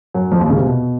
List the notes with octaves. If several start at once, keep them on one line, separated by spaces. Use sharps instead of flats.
F#2 F#3
F2 F3
D#2 D#3
C#2 C#3
C3
B2